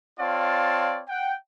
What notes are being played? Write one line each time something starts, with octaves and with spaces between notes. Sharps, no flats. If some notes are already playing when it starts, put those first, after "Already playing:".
C4 F4 C#5 D5 F5 A5
F#5 G5